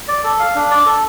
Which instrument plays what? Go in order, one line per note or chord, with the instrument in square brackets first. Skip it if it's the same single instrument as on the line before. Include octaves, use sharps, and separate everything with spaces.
[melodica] D5
A4
F5
D4
D5
A4